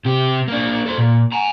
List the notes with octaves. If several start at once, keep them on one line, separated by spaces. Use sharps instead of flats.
C3 G4
A#3 D4
A4 C5
A#2
G#5 A#5